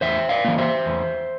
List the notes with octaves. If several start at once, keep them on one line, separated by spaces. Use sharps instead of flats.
E2 C5 E5
D5 F5
E3 A#3
C5 E5
E2